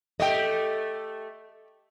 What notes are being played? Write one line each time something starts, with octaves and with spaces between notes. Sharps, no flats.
A3 G4 D#5 E5 G5